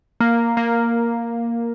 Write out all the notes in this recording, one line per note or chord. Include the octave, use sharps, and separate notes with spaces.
A#3
A#3